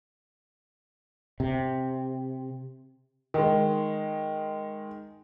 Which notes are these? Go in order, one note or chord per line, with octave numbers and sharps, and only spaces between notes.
C3
D#3 G#3